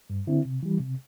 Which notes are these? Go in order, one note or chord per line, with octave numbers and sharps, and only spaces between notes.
G2
D3 C4 E4
C3
E3 G3
C3